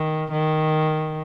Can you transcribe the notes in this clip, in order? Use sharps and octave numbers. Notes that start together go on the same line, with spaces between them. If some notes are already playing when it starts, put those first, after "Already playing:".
Already playing: D#3
D#3